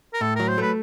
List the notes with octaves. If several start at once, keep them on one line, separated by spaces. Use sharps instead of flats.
A#4
A2 A4
F#3 A#4
C5
A3 B4